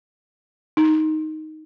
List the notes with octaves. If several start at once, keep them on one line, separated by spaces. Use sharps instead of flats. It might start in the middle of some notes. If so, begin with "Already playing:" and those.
D#4